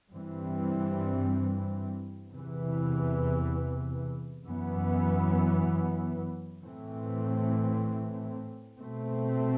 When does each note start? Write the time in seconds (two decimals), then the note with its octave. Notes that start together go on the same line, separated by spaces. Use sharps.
0.12 G2 E3 G3 C4
2.29 E2 C3 E3
4.45 F#2 E3 B3
6.62 A2 E3 A3 C4
8.78 B2 A3 C4